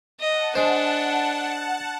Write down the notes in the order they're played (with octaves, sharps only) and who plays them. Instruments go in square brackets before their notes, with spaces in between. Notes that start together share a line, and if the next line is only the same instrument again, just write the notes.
[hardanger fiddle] D#5 [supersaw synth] F#5 A5
[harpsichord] G#3 C5 [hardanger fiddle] D4